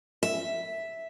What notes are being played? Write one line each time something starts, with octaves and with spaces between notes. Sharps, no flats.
E5